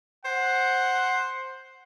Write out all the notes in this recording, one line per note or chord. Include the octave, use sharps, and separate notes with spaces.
C5 F#5